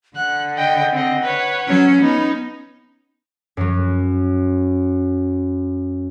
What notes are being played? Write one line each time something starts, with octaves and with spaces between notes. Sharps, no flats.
D3 F#5 F#6
D#5 G5
C4 D#5
B4 C#5
F#3 C#4
B3 C#4 D#4
F#2 F#3